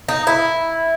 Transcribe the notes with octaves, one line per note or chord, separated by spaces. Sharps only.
D#4
E4